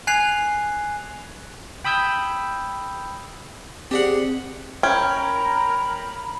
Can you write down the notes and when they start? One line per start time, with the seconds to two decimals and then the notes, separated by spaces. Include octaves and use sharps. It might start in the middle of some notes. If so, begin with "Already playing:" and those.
0.07 G#5 F#6 G#6 C7 F7
1.85 G5 B5 D#6 E6 G6 G#6
3.91 C4 G4 G#4 D5 F#5
4.83 C#4 A#4 G5 A#5 B5 G#6